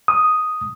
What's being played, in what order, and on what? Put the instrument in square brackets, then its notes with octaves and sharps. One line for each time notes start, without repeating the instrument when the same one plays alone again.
[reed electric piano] D#6